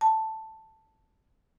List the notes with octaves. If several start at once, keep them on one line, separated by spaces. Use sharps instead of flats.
A5